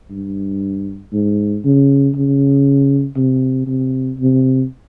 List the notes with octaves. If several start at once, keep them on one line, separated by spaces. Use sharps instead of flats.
G2
G#2
C#3
C#3
C3
C3
C3